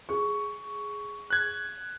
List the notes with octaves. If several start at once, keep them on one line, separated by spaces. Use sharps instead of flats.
G#4 C#6
F#6 G#6